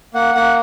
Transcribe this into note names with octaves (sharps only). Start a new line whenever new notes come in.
A#3 F#5
A#3 F#5